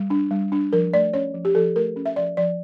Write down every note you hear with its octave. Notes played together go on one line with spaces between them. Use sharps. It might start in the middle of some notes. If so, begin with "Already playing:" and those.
Already playing: G3
D4
G3
D4
F3 A#4
A3 D5
C#4 C#5
F3
G4
F3 A4
A3 A#4
C#4
E5
F3 D5
F3 D5